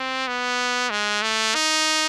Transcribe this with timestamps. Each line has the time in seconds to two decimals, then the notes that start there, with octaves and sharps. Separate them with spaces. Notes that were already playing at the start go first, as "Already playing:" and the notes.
Already playing: C4
0.27 B3
0.90 G#3
1.22 A3
1.55 D#4